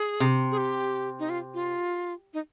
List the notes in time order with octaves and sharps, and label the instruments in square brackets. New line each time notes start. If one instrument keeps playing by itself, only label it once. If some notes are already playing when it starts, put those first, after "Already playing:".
Already playing: [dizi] G#4
[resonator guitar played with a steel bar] C3
[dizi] G#4
G4
D#4
F4
F4
D#4